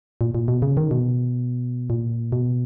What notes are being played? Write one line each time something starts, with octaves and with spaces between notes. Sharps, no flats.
A#2
A#2
B2
C#3
D#3
B2
A#2
B2